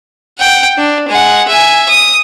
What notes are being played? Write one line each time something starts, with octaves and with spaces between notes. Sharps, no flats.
F#5 G5
D4
G#3 F#5
E5 G#5
D#6